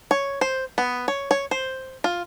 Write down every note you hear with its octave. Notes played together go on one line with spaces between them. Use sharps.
C#5
C5
B3
C#5
C#5
C5
F4